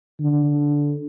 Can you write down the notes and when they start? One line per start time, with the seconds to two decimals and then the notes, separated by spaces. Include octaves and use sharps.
0.20 D3